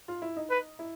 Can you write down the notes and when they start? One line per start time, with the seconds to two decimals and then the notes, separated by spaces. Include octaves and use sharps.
0.08 F4
0.22 E4
0.36 D#4
0.50 B4
0.79 E4